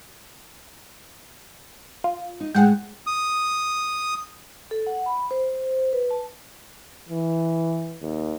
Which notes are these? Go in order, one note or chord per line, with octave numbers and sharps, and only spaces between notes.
F4
D#4
A2 G#3 G#4 F#5 G5
D#6
A4
F#5
B5
C5
B4
A5
E3
D#2